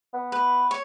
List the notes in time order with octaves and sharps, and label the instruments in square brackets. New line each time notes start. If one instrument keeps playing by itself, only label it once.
[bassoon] B3
[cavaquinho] B4
C#5